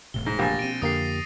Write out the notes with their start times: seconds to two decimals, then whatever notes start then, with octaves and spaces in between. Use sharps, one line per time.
0.14 E1 A2 C3 G7
0.26 G#2 G#3 A#6
0.39 A#1 G4 G#5 A6 A#6
0.59 B2 C4 D7 D#7
0.82 F2 D3 A#3 G4 D#6 C7